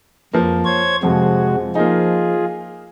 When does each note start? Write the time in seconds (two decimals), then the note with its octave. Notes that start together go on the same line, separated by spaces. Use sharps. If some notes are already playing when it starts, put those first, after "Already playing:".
0.33 F2 F3 A#3
0.65 C5 C#5 G#6
1.03 F2 C3 F3 G#3 F#4
1.75 A#3 D#4 F4 G#4